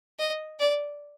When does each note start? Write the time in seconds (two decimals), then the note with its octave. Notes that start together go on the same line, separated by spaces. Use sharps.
0.19 D#5
0.59 D5